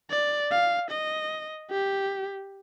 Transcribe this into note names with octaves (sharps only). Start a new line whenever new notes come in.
D5
F5
D#5
G4